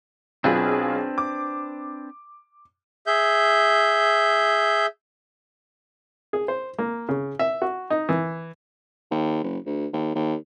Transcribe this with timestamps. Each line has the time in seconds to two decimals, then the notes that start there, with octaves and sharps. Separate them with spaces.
0.44 B1 C4 D4 F4 G#4 B4
1.18 D6
3.07 G#4 E5 G6
6.33 G#4
6.48 C5
6.78 A#3
7.09 C#3
7.39 E5
7.62 F#4
7.90 D#4
8.09 E3
9.11 D#2
9.44 F#1
9.66 D2
9.93 D#2
10.15 D#2